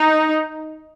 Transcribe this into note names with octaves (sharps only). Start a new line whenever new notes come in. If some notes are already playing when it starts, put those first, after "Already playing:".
Already playing: D#4